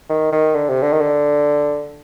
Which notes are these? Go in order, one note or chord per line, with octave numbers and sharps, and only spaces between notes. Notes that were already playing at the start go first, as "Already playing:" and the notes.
D#3
D#3
D3
C3
D3
D#3
D3